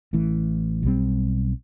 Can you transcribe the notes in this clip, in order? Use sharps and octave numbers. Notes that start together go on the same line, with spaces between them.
A1 A2 E3
B1 A#2 G3 C4